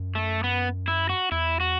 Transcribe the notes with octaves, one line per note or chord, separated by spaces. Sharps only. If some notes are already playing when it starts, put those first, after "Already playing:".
Already playing: F#2
A3
B3
E4
F#4
E2 E4
F#4